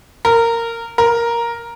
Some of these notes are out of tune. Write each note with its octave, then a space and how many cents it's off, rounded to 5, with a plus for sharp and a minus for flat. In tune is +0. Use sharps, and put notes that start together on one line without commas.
A#4 -15
A#4 +5